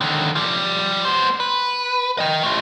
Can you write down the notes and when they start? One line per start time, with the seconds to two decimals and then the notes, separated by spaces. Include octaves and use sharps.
0.01 D3 D#3
0.35 F3 G3
1.05 B3 C5
1.40 B4
2.18 D#5 G5
2.43 A3 F4